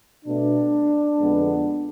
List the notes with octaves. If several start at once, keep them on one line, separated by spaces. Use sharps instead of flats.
B2 A3 D4
F2 D3 G#3 B3